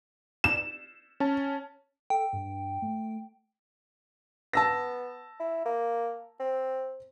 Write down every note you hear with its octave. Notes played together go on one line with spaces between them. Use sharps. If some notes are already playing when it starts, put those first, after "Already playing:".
E7
C#4 A5
A4 G5
G2
A3
B3 A5 E6 A#6
E4
A#3
C4